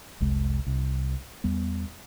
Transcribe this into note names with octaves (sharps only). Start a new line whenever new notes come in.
F1 C2 G#3
C2
E2 G3 B3